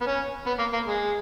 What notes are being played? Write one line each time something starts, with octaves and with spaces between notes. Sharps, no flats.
B3
C#4
B3
A#3
A#3
G#3